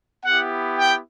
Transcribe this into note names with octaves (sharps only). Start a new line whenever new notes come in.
B3 E4 G4 F#5
G5